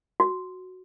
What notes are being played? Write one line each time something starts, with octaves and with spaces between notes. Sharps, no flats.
F#4